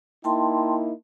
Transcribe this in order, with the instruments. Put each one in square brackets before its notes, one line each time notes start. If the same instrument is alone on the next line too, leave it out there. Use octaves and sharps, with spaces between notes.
[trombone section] A#3 D#4 E4 [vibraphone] G5 A5 C6